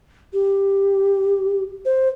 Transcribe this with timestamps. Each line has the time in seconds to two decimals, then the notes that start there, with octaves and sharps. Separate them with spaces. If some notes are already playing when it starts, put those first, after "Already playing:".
0.34 G4
1.86 C5